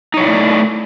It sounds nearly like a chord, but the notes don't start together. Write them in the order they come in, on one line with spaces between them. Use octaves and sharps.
D#4 C#5 E4 D5 A3